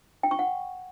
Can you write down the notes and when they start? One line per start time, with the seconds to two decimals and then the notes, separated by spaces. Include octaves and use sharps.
0.23 G5
0.31 C#6
0.39 F#5